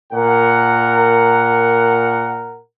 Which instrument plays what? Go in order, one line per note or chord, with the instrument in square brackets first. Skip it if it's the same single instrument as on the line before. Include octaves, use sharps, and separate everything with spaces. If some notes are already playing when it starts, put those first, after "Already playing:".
[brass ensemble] A#2 A#4 F#5